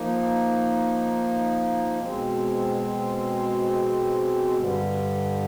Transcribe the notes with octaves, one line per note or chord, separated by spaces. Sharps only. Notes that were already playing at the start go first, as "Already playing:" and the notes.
Already playing: F3 A#3 D#4
B2 G#3 C4
G2 D3 G3